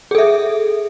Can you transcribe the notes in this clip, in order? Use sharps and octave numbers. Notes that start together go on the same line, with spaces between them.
G#4 A4 E5